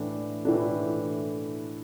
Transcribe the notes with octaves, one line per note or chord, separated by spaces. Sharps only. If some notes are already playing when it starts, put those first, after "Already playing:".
Already playing: A2 E3 A3 D4
A2 E3 A3 D4